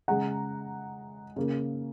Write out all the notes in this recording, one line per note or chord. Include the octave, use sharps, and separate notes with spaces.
C#3 G#3 F#5 A#5
C#3 A#3